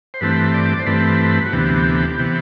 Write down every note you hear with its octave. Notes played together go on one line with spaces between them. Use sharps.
C5
G2 E3 A3 C4 B4
D5
C5
G2 E3 A3 C4 B4
F#4
D2 C3 E3 B3 G4
C3 E3 B3